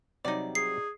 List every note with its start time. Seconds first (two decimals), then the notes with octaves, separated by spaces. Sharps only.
0.25 C3 F#3 G3 D#4 D5
0.55 G#4 C7